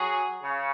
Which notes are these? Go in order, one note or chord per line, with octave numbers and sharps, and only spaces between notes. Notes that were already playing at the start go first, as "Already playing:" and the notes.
Already playing: F#3 G#4
C#3